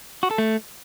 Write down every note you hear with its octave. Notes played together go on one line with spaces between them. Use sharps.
F#4
A4
A3